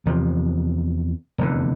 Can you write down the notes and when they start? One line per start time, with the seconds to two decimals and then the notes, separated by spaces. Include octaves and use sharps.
0.06 E2 C3 F3
1.38 F1 E2 D3